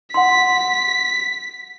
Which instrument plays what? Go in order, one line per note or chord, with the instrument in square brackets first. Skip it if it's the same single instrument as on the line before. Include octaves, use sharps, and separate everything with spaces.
[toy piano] F#5 C6 [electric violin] B6